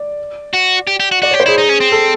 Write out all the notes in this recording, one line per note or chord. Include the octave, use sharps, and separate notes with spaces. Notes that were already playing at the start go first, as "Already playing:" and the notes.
Already playing: D5
F#4
G4
G4
F#4
F#4 D5
G4 C#5
C5
E4 G#4
D#4 G#4
C#4
C4
A4